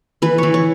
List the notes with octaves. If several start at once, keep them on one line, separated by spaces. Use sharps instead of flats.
E3 B4
E3 C#5
C#5